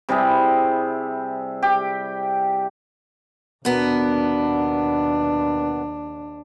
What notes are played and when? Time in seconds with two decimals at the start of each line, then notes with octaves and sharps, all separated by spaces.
0.09 C3 G3 E4 G#4
1.62 G4
3.65 D#2 B2 B3 D4 A#4